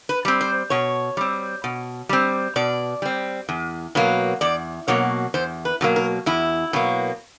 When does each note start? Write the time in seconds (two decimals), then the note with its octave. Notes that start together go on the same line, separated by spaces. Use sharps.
0.09 B4
0.25 G3 C4
0.41 C5
0.70 B2 C#5
1.17 G3 C4
1.64 B2
2.09 G3 C4
2.56 B2 D5
3.02 G3 C4
3.49 E2
3.95 B2 F#3 A#3
4.41 E2 D5
4.88 B2 F#3 A#3 C#5
5.34 E2 C5
5.65 B4
5.81 B2 F#3 A#3
5.96 A#4
6.26 E2 E4
6.73 B2 F#3 A#3